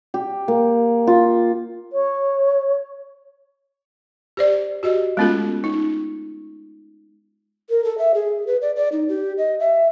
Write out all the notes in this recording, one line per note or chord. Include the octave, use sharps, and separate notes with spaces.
G4
A#3
F4
C#5
G4 C5 D5
F#4 G4 D#5
G#3 A3 B3 C#4 F4 A4
D#4
A#4
A4
E5
G#4
B4
D5
D5
D#4
G4
D#5
E5